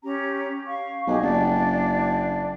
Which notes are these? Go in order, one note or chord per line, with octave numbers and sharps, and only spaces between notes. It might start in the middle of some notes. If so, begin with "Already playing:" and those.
C#4 G4 A#5
F5 C#6
B1 G4 G#4 D#5
F#1 D4 D5